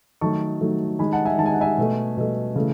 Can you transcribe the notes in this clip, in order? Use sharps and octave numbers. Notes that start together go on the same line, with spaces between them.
D#3 F#3 A3 A5 C#6
D#3 F#3 A3
D#3 G#3 G#5 B5
F#5 A5
E5 G#5
D#3 G#3 G#5 A5
F#5
E5 G#5
B2 A3
B2 A3
C#3 E3 A3